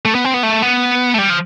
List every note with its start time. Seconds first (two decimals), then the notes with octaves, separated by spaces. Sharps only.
0.05 A3
0.15 B3
0.25 C4
0.34 B3
0.43 A3
0.62 B3
1.14 A3
1.18 G3
1.30 F3